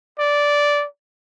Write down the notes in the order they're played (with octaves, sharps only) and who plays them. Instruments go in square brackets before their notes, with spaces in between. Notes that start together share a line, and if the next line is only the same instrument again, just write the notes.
[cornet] D5